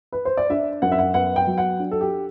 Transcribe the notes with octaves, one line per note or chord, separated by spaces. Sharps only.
B4
C5
D5
D4 E5
F#2 F#5
E5
F#5
B3 F#5
G5
F#3
F#5
D4
A4
G4